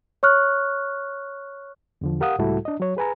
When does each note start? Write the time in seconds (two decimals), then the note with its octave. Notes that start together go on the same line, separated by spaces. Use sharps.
0.23 C#5 C#6 F6 F#6
2.01 E2 D3 F3
2.20 G4 A#4 F5 F#5 D#6
2.39 C#2 A2 G3 E4 F#4 A4
2.65 D4 D#5
2.80 F#3 C#5
2.97 G#4 B4 G#5 A#5